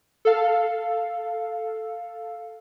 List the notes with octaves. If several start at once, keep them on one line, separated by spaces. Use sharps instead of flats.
A4 F5